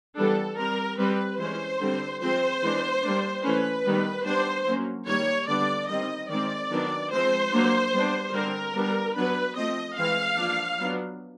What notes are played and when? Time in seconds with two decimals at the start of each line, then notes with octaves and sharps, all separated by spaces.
0.16 E3 G3 B3 D4 A4
0.57 G3 C4 A#4
0.98 G3 C4 B4
1.39 E3 G#3 C#4 C5
1.80 D3 G3 C4
2.21 F3 G#3 C4 C5
2.62 E3 G#3 B3 D4
3.03 G3 A#3 D4
3.43 E3 A3 C#4 B4
3.84 D#3 G3 B3
4.25 G3 B3 D4 C5
4.66 F#3 A#3 C#4
5.07 D#3 G3 A#3 C#5
5.48 D3 G3 B3 D4 D5
5.88 D#3 G3 C4 D#5
6.29 D#3 G#3 C4 D5
6.70 D#3 F#3 B3 D4
7.11 F3 G#3 C4 C5
7.52 F#3 A#3 D4
7.93 G3 B3 D4
8.34 D3 G3 C4 A#4
8.75 G3 B3 D4
9.15 F#3 B3 D4 B4
9.56 F3 A3 C4 D#5
9.97 E3 G#3 C4 F5
10.37 F3 A#3 D4
10.79 F#3 B3 D4